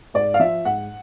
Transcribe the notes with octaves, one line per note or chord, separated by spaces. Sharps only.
G#2 D5
F5
F3 E5
G#2 F#5